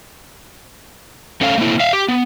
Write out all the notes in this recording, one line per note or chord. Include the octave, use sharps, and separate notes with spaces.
A3 C#4 A4 F5
A3 A#3 C4 C#4 E4
E5 F5
G4
B3